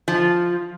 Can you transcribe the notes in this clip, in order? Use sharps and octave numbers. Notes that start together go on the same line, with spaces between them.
F3